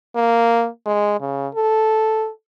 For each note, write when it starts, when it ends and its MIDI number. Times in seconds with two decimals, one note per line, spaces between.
0.16 0.67 58
0.86 1.18 56
1.21 1.48 49
1.55 2.30 69